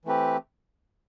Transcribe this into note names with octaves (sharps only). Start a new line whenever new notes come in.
E3 A3 C4 G4 B4